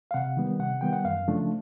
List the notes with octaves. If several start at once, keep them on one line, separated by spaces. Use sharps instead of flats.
F5
C3 F#5
D#3 G3 B3
C3 F#5
D#3 G3 B3 G5
F#5
F#2 F5
C#3 F3 A3 D4